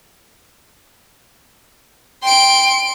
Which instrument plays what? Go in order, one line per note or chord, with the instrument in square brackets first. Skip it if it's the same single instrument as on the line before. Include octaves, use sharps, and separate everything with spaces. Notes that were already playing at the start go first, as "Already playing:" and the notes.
[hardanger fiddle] G5 [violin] C6 D7